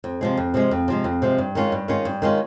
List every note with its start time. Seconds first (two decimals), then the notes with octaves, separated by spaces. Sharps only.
0.04 F2
0.21 C3 F3 G#3
0.37 F2
0.54 C3 F3 G#3
0.71 F2
0.88 C3 F3 G#3
1.04 F2
1.22 C3 F3 G#3
1.38 G2
1.55 D#3 G#3 C#4 F4
1.72 G2
1.88 D#3 G#3 C#4 F4
2.05 G2
2.22 D#3 G#3 C#4 F4